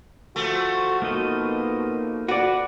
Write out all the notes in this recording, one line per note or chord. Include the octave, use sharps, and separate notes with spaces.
F3 A3 F#4
B2 A#3 D#4 D#5
F#4 B4 D5